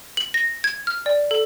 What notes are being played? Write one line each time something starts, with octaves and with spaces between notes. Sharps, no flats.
F#7
A#6
G#6
F6
D5
A4